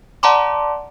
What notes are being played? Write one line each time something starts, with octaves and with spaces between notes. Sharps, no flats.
D5 F#5 A5 A#5 C6 D6